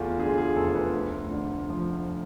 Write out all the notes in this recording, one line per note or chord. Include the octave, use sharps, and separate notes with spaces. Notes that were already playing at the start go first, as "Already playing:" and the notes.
Already playing: E2 A3 F4
D3 G#4
F4
G#4
F1 A4
B4
D2
D3
F3